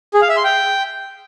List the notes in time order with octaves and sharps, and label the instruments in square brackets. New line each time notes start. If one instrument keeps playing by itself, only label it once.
[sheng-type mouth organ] G#4
F5
E5
C6
G5